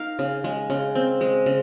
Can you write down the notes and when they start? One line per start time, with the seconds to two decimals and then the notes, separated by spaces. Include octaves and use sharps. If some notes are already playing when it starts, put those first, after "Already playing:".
Already playing: D#4 A#4 F5
0.19 C#3
0.44 G#3
0.70 C#3
0.95 C4
1.21 G#3
1.46 C#3